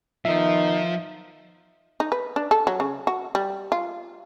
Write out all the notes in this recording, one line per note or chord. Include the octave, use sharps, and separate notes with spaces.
D#3 F3 B3 D#4 E5
D#4
B4
D4
A4
F#3
C#3
F#4
G3
F4